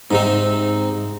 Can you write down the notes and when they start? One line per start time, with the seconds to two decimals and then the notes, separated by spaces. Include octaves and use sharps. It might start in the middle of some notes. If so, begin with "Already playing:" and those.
0.11 G#2 C3 C4 D#4 A#5